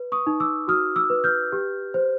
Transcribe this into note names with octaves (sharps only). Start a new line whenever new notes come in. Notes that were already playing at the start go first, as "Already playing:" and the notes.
Already playing: B4
C#6 D#6
D#4
D6 E6
F#4 D#6 F6
D6 E6
B4
F6 G6
G4
C5